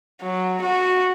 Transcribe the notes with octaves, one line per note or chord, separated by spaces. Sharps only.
F#3
F#4